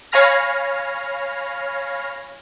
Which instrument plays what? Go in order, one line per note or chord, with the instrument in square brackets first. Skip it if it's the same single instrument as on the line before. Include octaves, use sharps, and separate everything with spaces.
[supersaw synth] C#5 F5 G#5 B5 F6 A#6